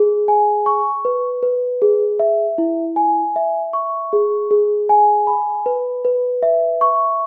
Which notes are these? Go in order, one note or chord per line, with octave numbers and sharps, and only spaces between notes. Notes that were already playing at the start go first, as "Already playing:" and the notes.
Already playing: G#4
G#5
C#6
B4
B4
G#4
E5
E4
G#5
E5
C#6
G#4
G#4
G#5
B5
B4
B4
E5
C#6